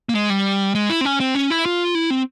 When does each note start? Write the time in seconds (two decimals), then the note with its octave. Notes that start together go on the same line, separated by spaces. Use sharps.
0.09 A#3
0.15 G#3
0.30 G3
0.75 G#3
0.90 E4
1.01 C4
1.05 C#4
1.20 C4
1.35 C#4
1.50 E4
1.66 F4
1.95 E4
2.10 C4